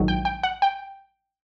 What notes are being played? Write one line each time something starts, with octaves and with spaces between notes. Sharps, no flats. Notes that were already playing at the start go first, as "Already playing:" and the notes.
Already playing: A#1 G#2 D#3 F#3
G5
G5
F#5
G5